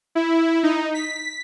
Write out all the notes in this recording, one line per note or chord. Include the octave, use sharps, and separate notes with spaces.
E4
D#4
B6